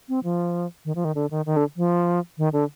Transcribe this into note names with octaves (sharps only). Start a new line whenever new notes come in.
C4
F3
D#3
F3
D#3
D3
D#3
D#3
D3
F3
D#3
D3